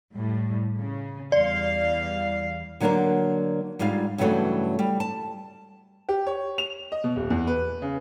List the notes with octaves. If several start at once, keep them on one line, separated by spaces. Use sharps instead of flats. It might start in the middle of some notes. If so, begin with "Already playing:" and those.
A2 G3
C#3
E2 G3 D5 F5
D3 F#3 A#3 D4 F#4 A#4
G#2 G3 F4 G#4 F5
G2 C#3 E3 F#3 A3 F#4
G3
A5
G4
C#5
F7
D#5
B2
D#1
E2
B4
C#3